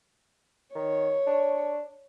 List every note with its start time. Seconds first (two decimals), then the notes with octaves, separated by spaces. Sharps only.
0.75 D#3 C#5
1.27 D4